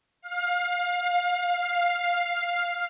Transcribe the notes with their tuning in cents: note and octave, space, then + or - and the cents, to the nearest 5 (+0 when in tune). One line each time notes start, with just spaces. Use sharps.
F5 +25
F5 +5